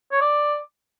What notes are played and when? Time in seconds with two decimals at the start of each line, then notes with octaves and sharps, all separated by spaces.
0.12 C#5
0.21 D5